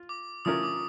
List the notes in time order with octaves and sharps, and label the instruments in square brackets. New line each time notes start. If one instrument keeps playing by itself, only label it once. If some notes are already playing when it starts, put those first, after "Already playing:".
Already playing: [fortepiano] F4
[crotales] D6
[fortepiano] F3 A3 C#4 F4 A#4 [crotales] D#6
[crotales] D6